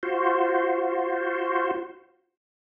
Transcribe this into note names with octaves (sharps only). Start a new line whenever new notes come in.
F4 F#4 C5